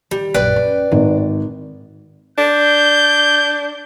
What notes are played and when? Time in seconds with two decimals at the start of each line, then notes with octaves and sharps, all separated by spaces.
0.11 D#3 G3
0.34 A#1 F#2 B4 D5 G5
0.56 C#4
0.91 G#1 A2
2.38 D4 G6